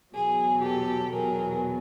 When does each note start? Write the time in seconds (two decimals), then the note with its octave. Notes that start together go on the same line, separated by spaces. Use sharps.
0.14 E2 B2 F#3 G#4
0.63 G4 A4
1.12 E2 B2 F#3 G#4 A#4